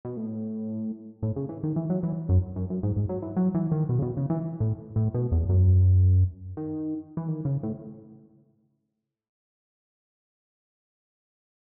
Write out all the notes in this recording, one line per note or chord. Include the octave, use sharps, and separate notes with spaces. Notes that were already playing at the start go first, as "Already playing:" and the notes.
B2
A2
A2
C#3
E3
D#3
E3
F#3
E3
F#2
F#2
F#2
G#2
G#2
F#3
E3
F#3
E3
D#3
B2
C#3
B2
C#3
E3
A2
A2
B2
E2
F#2
D#3
E3
D#3
C#3
A2